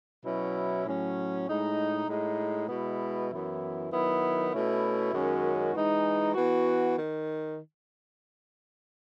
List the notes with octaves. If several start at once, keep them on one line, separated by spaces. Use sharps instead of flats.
B2 F#3 C#4 E4
A2 F#3 C#4
A2 G#3 D#4
A2 G#3 D#4
B2 G#3 B3 E4
F#2 E3 B3 E4
D#3 F#3 B3 E4
B2 A3 C#4 E4
F#2 D#3 G#3 C#4 F#4
E3 G#3 D#4
E3 B3 F#4
D#3